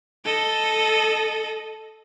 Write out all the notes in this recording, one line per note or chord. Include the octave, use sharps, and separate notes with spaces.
A4 D#5